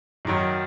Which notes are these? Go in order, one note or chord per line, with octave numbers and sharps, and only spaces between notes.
F#2 D#3 F#3